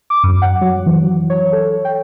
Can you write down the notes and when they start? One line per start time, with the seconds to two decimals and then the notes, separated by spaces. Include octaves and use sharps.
0.10 D6
0.23 F#2
0.42 F#5
0.61 F#3
0.86 E3
1.03 F#3
1.30 C#5
1.53 A4
1.85 G5